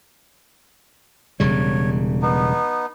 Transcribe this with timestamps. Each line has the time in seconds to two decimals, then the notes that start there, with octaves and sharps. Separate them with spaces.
1.40 E1 C#3 G3 C#5
2.22 B3 D#4